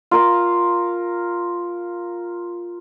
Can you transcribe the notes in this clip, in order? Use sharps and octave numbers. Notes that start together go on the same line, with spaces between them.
F4 A#4 F5